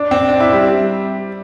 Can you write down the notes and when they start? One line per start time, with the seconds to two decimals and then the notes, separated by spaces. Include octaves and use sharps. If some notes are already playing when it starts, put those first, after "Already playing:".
Already playing: D4
0.11 C4
0.28 D4
0.40 E4
0.53 G3